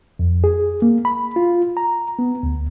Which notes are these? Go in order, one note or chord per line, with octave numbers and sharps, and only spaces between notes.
F2
G#4
A#3
B5
F4
A#5
B3
D2